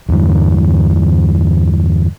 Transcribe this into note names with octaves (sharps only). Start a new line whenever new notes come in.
E2 G2 D3